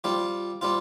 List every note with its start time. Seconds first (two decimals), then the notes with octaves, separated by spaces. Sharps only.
0.04 G3 C4 F4
0.61 G3 C4 F4